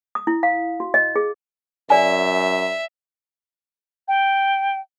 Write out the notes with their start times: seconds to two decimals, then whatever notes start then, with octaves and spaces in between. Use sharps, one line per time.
0.15 D#6
0.27 E4
0.43 F5
0.80 F#4
0.94 D#5
1.16 G#4
1.90 F#2 D5 E5 G#5
4.08 G5